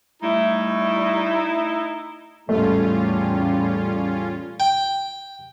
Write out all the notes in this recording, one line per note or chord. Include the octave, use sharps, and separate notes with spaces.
G3 A3 D#4 E4
E2 A2 G3 A3 C#4 F4
G5